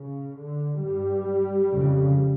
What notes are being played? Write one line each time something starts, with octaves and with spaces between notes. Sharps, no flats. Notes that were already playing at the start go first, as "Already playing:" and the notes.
Already playing: C#3
D3
G2 G3
F2 C#3